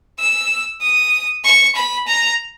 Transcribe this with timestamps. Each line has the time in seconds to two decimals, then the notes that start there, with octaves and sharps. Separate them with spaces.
0.19 E6
0.81 D#6
1.44 C#6
1.75 B5
2.07 A#5